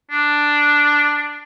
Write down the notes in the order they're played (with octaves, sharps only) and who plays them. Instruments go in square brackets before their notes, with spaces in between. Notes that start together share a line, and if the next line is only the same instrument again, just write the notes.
[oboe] D4